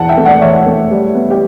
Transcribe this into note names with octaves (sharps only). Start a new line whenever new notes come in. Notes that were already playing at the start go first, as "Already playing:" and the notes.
Already playing: E2 F#5 A5
E5 G5
A3
D5 F#5
E2 C#5 E5
A3
G3
B3
G4